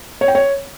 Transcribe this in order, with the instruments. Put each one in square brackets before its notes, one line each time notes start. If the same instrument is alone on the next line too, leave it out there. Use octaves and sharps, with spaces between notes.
[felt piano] C#5
G5
C#5